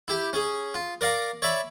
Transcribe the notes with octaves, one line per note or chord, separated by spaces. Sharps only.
E4 G4
C#4 G#4
F4
A#4 D5 F5 A#5
C#5 D5 E5 B5